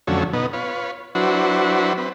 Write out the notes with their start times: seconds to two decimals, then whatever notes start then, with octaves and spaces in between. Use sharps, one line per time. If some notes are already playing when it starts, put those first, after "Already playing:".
0.07 F2 D3 F#3 A3 C#4
0.33 B2 B3 D#4
0.53 F4 B4 C#5
1.15 F#3 D4 E4 F#4 B4 C5
1.98 C4 B4